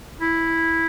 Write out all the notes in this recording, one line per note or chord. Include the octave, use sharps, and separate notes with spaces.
E4